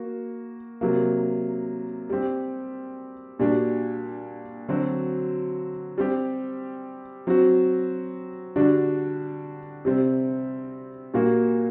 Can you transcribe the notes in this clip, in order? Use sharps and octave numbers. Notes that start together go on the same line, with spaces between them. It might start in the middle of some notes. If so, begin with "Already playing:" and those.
Already playing: A#3 F#4
C3 F#3 A#3
G3 C4 G4
A#2 G3 D4 F#4
D3 F#3 C4 F#4
G3 C4 G4
F#3 C4 F#4
D3 G3 D4 F#4
C3 G3 C4
A#2 G3 A#3 F#4